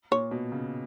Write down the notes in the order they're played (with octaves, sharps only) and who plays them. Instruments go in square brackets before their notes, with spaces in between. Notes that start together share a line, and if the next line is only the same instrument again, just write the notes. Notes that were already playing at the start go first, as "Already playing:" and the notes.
[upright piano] A#2 [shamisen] C#5
[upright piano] B2
C#3